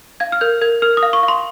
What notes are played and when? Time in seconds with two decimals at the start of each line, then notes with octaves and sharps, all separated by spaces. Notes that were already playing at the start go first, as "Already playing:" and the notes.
0.20 F5 G#6
0.32 F6
0.41 A#4 G6
0.62 A#4 G#6
0.82 A#4 F6
0.97 D#6
1.03 F5
1.13 C#6
1.23 F5
1.28 C6